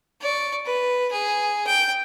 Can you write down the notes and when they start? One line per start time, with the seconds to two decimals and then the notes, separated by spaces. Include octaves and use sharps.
0.21 D5 C#6
0.65 B4
1.12 G#4
1.67 G5